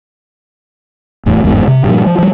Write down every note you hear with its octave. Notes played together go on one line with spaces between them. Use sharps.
D1 E2 A2
G1 E2 G#2 B3
C3
G2 A#2 F3
F3
F3 G3